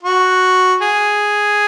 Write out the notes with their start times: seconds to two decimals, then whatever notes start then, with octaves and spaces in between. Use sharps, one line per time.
0.03 F#4
0.82 G#4